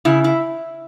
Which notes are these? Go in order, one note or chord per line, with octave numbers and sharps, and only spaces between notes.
C#3 E4
E4